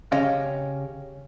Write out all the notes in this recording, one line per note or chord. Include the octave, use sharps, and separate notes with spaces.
C#3 C#4 G4 C#5 D#5 F5